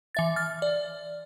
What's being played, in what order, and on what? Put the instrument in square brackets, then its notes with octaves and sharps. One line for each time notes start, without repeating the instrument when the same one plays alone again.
[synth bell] E3 E5 A6
F6 A6
D5